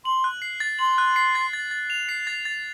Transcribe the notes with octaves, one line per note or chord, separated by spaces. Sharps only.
C6 F#7
F#6
C7
A6
C6 F#7
F#6
C7
A6
A6
A6
F7
C7
A6
A6